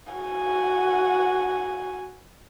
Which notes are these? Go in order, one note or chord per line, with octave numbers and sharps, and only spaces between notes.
F#4 G#5